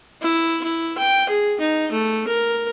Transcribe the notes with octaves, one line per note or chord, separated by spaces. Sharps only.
E4
E4
G5
G#4
D#4
A3
A#4